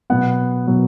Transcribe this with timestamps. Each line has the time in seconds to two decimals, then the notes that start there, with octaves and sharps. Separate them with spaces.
0.10 B2 F#3 B3 F#5
0.67 B2 F#3 B3